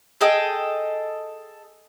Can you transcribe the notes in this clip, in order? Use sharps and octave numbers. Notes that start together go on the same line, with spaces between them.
G#4 A4 D#5 G5